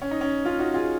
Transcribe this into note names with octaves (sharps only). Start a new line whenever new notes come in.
C#4
D#4
C#4
C#4 F4
D#4 F#4
F4 G#4